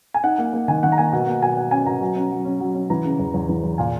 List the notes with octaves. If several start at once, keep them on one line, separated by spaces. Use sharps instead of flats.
G#5
D#4 F#5
A#3
A#3
D#3 G#5
D#3 F#5
A#5
A#3 G#5
B2 F#5
A#3 F#5
B2 G#5
B2 F#5
C#4 G#5
B2 A#5
F#3
C#4
F#3
C#4
F#3
C#4
E3 A#5
C#3
E2
E2
E3
E2
A#2 G#5